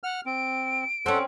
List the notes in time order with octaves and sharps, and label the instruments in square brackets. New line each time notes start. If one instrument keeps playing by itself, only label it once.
[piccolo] F#5 [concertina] F6
[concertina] C4 [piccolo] D7
[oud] C4 C#4 [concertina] A4 F#5